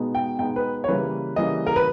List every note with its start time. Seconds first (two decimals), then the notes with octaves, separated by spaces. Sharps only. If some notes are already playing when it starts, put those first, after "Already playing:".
Already playing: B2 G#3 B3 D#4
0.15 G5
0.39 B2 G#3 B3 D#4 G5
0.56 B4
0.84 C#5
0.88 C#3 E3 G3 A#3 B4
1.36 C#3 E3 G3 A#3 D#5
1.66 A#4
1.76 B4